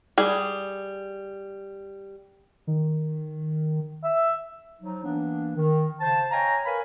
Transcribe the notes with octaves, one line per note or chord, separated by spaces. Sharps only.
G3 G#4
D#3
E5
F3 F#3 D#4
E3 A#3 B3 D4
D#3
C#3 C5 A5
C#5 D#5 F5 G5 G#5 A#5
A#4 B4 C#5 F5 G#5 B5